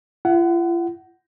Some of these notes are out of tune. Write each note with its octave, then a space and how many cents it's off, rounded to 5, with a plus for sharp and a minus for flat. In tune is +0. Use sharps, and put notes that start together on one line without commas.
F4 -45 F#5 +15